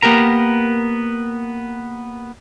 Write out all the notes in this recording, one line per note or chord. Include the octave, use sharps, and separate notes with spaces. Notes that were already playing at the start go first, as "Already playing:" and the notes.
A#3 B3 G4 A#4 A#5